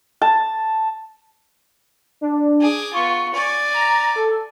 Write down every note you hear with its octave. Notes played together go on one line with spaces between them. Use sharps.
A5
D4
G#4 D6
B3 F4 C#6
D5 G#5
A#5
A4